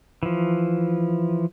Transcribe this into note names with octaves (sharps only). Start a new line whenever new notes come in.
E3 F3